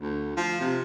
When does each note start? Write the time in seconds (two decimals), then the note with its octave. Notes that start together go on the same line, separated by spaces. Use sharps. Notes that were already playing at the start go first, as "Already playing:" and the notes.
0.01 D2
0.37 F3
0.60 C3